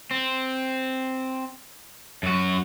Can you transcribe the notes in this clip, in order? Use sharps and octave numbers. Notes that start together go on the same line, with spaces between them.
C4
F#2 F#4